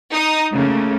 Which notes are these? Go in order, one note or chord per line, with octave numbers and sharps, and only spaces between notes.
D#4 D#6
C#3 A3 A#3